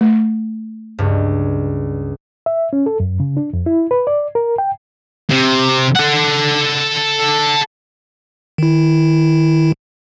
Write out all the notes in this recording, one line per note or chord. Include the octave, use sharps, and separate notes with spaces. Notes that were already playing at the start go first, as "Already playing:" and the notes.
A3
C#2 G2
E5
C#4
A4
F#2
C#3
D4
F2
E4
B4
D5
A#4
G5
C3
A4 F#5
D#3 E4